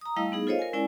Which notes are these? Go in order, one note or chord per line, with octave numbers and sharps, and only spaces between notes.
A#5 D#6
G3 A3 E4 D#5 F5 E6
B3 D#4 G#4
F4 A4 C5 C#5 D#5 F5
A#4 G#5
G#3 C#4 E4 D5 G#5